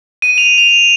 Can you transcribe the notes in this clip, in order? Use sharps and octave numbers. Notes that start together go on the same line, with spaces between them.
D#7
F7
F7